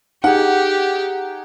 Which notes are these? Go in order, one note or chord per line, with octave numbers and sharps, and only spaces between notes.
D#4 G4 G#4 F#5